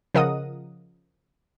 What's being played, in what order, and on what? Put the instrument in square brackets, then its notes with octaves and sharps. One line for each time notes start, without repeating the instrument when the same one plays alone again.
[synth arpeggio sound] C#3 F3 A#4 D#5 F#5 D#6